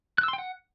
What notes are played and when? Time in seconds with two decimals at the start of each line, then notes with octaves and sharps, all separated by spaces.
0.18 F#6
0.23 E6
0.28 C6
0.33 G5
0.38 F#5